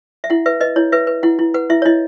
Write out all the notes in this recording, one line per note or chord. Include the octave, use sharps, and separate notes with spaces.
E5
E4 F#5
B4 E5
B4 D#5
E4 C#5
B4 E5
B4
E4 F#5
E4
B4 F#5
E4 E5
C#5
E4 D#5